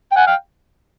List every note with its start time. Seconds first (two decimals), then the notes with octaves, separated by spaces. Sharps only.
0.12 G5
0.16 F#5 G#5
0.27 F5 G5